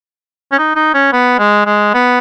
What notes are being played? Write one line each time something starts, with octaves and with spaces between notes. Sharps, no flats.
C#4
D#4
D#4
C#4
B3
G#3
G#3
B3